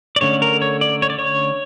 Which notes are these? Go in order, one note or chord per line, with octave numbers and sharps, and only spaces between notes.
D5
D3 A3 C#4 C#5
A#4
C#5
D5
C#5
D5
C#5